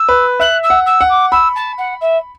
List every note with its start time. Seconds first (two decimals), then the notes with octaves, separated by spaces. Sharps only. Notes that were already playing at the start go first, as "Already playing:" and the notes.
Already playing: E6
0.09 B4
0.40 E5 F#6
0.63 E6
0.70 F#5
0.86 E6
1.01 F#5
1.09 D6
1.31 B5 E6
1.55 A5
1.78 F#5
2.01 E5